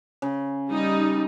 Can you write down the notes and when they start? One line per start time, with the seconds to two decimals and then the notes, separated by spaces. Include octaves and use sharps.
0.22 C#3
0.72 G3 D#4